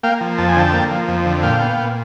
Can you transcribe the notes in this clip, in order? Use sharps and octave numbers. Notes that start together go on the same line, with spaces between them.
A#3 F5 G5
F3
F2 A5
G#5
D3 G5 A5
A#3
F3
F2
D3
A#2 F5 G5
B3
A#2